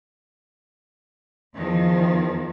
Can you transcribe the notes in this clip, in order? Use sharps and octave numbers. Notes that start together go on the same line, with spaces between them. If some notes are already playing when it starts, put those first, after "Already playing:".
E2 D#3 F3